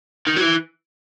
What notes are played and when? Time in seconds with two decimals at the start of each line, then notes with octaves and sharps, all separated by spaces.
0.27 D#3
0.37 F#3
0.41 E3